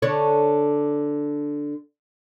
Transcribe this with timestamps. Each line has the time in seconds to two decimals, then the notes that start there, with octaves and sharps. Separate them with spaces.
0.02 D3 D4 C#5